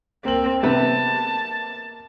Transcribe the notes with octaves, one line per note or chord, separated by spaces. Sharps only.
A#3 C4 F#7
C3 B3 C4 A5